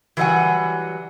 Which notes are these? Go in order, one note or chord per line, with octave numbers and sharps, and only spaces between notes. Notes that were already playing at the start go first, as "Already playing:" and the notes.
E3 F#3 G3 D#5 F#5 G#5